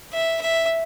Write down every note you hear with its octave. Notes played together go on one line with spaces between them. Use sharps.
E5
E5